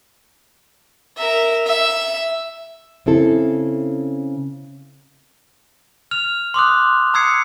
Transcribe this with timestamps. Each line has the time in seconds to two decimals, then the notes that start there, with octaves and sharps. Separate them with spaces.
1.18 A#4 E5
1.67 E5
3.06 C#3 C4 E4 A4
6.11 F6 F7
6.54 C6 D6 D#6 F#6
7.14 A#5 D#6 E6 G#6 C7 C#7